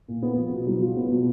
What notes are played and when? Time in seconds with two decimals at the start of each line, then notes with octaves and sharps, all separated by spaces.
0.08 A#2
0.22 B3
0.37 F3
0.52 B2
0.67 F#3
0.82 F4
0.97 B3
1.12 B2